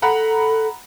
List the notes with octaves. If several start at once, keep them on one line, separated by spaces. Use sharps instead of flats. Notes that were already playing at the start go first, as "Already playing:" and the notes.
A4 F#5 A#5 B5